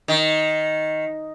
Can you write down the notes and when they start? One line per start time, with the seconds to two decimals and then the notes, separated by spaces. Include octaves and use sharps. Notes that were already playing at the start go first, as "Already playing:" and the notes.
0.08 D#3